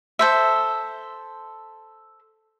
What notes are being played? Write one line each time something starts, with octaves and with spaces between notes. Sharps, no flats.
A4 C5 E5